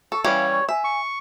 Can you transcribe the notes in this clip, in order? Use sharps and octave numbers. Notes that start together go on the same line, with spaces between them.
A4 C#6
E3 G3 C#4 C#5 F5
C#6
E5 G#5
C#6